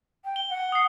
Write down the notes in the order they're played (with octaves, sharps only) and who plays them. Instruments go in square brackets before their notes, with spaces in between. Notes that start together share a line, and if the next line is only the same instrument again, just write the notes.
[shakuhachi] G5
[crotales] G7
[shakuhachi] F#5
[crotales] D#6 C7